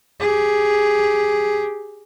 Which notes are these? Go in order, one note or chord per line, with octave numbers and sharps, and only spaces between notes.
G4 G#4